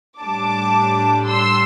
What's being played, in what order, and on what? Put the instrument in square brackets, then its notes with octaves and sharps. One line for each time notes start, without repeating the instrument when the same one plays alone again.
[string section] A2 G3 D4 A5 D6
C6 E6